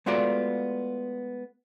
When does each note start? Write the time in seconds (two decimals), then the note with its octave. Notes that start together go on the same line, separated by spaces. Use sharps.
0.06 G#3 A3 B3 F4 F#4 D5